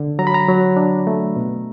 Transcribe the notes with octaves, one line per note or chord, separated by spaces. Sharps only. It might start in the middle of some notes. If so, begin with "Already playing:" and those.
Already playing: D3
F#3 A#5
B5
A#5
F#3
D4
A3
B2